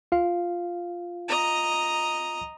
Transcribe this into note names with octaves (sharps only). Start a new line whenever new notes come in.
F4 F5
D#5 A#5